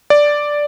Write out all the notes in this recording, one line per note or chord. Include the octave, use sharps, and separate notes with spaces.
D5